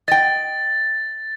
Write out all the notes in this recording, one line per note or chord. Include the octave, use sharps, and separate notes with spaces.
D#5 G5 A6